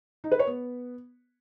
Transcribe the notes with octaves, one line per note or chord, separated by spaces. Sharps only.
D#4
B4
C#5
B3